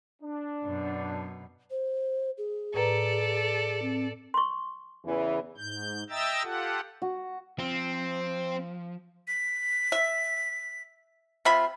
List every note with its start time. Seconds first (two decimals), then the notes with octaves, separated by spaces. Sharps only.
0.22 D4
0.64 F#2 B2
1.71 C5
2.38 G#4
2.74 A2 A4 B4 D5 A#5
3.82 C4
4.34 C6 C#6
5.05 E2 C#3 E3
5.57 G#2 G6
6.10 D#5 E5 G5 A#5 E6 A6
6.43 F4 G4 A4 F#5
7.02 F#4
7.59 F3 C4
9.28 B6
9.92 E5
11.45 C3 F4 E5 B5